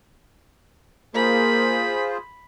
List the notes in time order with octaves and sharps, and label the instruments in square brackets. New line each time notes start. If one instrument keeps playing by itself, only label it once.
[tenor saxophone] A#3 [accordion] F4 G#4 C5 [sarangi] B5